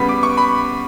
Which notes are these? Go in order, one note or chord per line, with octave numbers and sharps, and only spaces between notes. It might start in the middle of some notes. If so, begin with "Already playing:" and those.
Already playing: C#3 G3 B3 B5
D6
C#6
B5